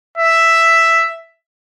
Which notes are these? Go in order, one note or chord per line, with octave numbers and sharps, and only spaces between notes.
E5